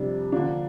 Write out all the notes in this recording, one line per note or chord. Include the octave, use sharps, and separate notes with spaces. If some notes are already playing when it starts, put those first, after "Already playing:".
Already playing: F2 C3 G3 D4
D3 F3 A#3 D4